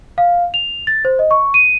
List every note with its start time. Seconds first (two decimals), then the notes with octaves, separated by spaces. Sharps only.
0.18 F5
0.54 F7
0.87 A6
1.05 C5
1.19 D#5
1.31 C#6
1.54 D#7